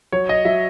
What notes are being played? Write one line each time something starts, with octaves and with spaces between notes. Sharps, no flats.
F#3 C#5
D#5
F#3 E5